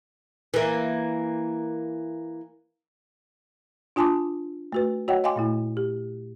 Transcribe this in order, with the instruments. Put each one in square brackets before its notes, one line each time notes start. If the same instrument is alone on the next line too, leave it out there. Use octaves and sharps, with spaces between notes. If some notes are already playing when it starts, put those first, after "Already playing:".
[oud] E3 A#3
[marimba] D4 F4 G#5 A5 C6 D6
A3 F#4 B4
F#4 C#5 D#5 F#5 G5
D#5 F5 G5 G#5 C6 D6
A#2 A3 E4
G4